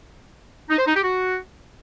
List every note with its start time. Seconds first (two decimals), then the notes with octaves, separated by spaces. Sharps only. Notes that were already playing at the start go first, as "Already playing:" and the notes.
0.70 D#4
0.78 C5
0.86 D#4
0.95 G4
1.03 F#4